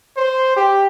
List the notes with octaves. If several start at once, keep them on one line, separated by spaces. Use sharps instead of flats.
C5
G4